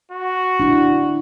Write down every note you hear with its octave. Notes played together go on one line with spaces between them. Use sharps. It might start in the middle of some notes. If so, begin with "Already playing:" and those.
F#4
D4 E4